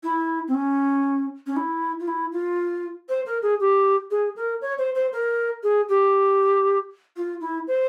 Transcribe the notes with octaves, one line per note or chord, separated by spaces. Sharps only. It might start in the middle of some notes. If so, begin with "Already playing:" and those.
E4
C4
C#4
C#4
E4
F4
E4
F4
C5
A#4
G#4
G4
G#4
A#4
C#5
C5
C5
A#4
G#4
G4
F4
E4
C5